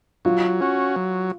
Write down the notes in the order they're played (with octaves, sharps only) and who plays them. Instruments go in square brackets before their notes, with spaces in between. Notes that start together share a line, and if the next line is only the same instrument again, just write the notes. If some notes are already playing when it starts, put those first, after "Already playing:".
[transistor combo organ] F#3 [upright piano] F4
[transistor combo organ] C#4 F#4
F#3